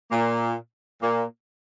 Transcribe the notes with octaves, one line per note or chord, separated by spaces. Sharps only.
A#2 A#3
A#2 A#3